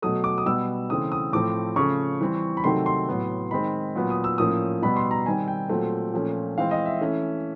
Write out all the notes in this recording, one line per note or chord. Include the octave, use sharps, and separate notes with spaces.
B2 F#3 A3 D#6
D6
D#6
B2 G3 B3 E6
C#3 E3 A3 C4 D#6
D#6
A2 F3 A3 C4 D6
C#3 F3 A3 C#6
E3 G3 C4
B5
C3 D#3 F#3 A3 C4 C6
C6
A2 F#3 B3
D#3 G#3 C4 B5
A#2 F#3 B3
D#6
E6
A2 F3 A#3 C#4 D#6
B2 G3 B3 B5
C6
A#5
D#3 G3 C4 G#5
G5
A#2 F#3 A3 C4
A#2 F3 A3 C#4
E3 G#3 C4 F5
D#5
E5
E3 A3 C#4